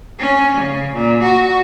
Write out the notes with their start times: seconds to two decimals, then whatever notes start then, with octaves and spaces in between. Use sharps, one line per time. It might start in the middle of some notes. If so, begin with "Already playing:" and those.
0.19 C#4
0.57 C#3
0.94 A#2
1.23 F#4